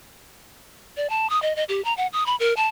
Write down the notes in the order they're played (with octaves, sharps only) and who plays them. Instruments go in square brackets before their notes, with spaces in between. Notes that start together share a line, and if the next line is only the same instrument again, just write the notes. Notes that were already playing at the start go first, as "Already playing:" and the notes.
[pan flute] D5
A5
D#6
D#5
D#5
G4
A#5
F#5
D#6
B5
A#4
A5